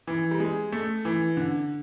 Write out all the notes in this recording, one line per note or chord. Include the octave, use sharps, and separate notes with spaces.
E3
G3
G#3
A3
E3
D3